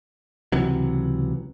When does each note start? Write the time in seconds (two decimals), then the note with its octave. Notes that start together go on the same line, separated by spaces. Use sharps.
0.52 C#2 C3 E3 F#3